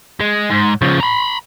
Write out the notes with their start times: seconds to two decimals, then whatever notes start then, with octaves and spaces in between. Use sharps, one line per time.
0.20 G#3
0.50 G#2
0.82 C#3 F3
1.00 A#5 B5